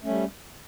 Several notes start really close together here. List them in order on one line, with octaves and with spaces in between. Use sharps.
A3 C#4 G3